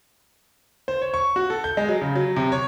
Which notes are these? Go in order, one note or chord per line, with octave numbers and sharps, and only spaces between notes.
C5
C#5
C#6
F#4
A4
G6
G#3
F#3
C#3
F#3
C3
C#5